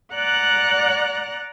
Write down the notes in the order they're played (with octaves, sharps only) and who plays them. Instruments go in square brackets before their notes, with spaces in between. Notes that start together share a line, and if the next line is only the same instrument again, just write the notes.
[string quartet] D5 F#5 A#5 F#6